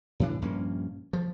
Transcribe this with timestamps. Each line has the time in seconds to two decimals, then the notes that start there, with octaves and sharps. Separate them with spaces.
0.20 A2 E3 D4
0.42 A#1 G2 A#3 C#4
1.13 F3